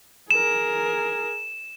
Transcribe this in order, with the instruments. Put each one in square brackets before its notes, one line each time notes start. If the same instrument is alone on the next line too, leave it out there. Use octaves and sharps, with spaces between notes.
[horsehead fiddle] G#4 A#4 [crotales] E7